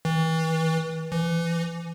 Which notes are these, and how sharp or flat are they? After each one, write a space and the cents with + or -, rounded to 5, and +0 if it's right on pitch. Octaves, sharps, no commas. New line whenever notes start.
E3 -35
E3 +30